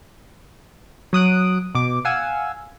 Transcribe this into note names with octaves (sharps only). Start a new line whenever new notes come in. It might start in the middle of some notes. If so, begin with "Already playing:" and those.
F#3 D#6 F#6 D7
B2 D6
F5 F#5 G#5 E6